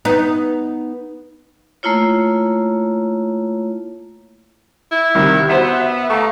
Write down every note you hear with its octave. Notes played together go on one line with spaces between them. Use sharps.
B3 D#4
A3 A#3 E4 F4 C#5
E4
C2 C3 D#3
B3 F#4 C5 E5
E5
A3 F5 A#5 C#6